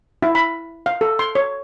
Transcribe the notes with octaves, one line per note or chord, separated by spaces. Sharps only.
E4
B5
F5
A4
C6
C#5